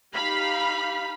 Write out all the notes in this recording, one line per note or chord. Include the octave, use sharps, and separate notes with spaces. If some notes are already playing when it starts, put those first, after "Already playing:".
D#4 G4 F5 B5